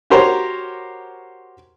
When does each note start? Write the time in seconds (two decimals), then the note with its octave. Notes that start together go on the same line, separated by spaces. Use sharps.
0.10 F#4 G4 A#4 C5 C#5 A#5